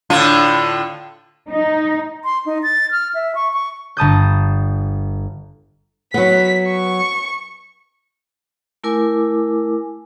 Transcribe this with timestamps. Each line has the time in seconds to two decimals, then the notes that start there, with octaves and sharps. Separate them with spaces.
0.10 A2 D3 F4
1.51 D#4
2.24 C6
2.46 D#4
2.63 A6
2.91 F6
3.14 E5
3.35 C#6
3.53 C#6
3.97 G1 A5 D#6 G6
6.14 F#3 B3 B6
6.70 C#6
8.84 A3 E4 A#4 G#5 D6